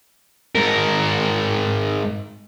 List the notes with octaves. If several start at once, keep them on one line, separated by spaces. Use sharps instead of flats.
G#2 A#4